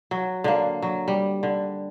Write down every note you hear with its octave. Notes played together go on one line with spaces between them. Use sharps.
F#3
D3 A#3
F#3
G3
D3